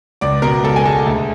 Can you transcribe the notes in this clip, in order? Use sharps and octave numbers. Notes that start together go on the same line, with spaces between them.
C#2 D5 D6
B2 A#4 A#5
C#2 A4 A5
G#5
G#3 A4 A5
D2